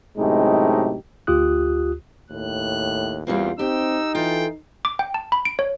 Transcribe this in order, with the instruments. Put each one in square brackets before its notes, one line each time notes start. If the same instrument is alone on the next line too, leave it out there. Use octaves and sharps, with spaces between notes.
[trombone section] F#2 A2 C3 G#3 D#4 G4
[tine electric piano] D2 F4 G4 D#6 F#6
[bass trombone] D#2 [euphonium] A2 [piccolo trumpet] F#6
[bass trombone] E2 [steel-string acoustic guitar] G3 A#3 C4 [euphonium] F4
[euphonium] C4 [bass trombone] D#4 [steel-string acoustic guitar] G4 G5 [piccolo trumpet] E6
[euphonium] E3 [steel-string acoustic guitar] F4 A4 [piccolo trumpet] G5
[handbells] D6
G5
A5
B5
D7
C#5